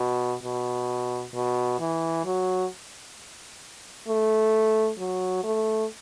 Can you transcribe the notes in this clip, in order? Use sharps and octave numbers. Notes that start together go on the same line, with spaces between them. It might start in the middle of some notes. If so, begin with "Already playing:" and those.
Already playing: B2
B2
B2
E3
F#3
A3
F#3
A3